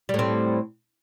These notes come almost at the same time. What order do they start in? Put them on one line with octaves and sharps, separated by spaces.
G3 A2 C4